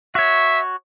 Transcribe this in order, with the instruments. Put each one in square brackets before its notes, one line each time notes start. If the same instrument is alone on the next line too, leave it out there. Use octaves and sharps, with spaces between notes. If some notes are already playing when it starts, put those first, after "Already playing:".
[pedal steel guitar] F#4 C#5 [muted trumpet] E5